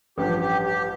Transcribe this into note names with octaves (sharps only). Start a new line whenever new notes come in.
A1 G2 F3 G4
G4
G4